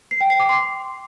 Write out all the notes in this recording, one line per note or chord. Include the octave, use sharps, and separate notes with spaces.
C7
G5
C7
D6
C6